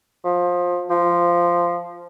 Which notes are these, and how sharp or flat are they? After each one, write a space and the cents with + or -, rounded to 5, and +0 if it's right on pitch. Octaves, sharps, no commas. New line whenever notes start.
F3 +20
F3 -10